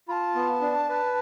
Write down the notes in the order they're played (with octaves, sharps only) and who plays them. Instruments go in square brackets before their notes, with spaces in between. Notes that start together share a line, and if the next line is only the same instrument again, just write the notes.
[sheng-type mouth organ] F4 [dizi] A5 B5
[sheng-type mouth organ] B3
D4
B4